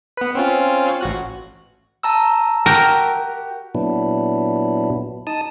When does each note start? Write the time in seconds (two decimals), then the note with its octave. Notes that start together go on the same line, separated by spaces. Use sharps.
0.17 B3 B4
0.35 C4 C#4 F4
1.01 A1 F#4 F#6
2.03 A5 A#5 E6
2.66 F#4 G4 A#4
3.75 A#2 F#3 B3 D4 E4
5.27 D#4 A5 D#6